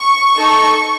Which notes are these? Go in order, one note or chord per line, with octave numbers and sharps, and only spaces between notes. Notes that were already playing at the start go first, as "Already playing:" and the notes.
Already playing: C#6
D#4 A4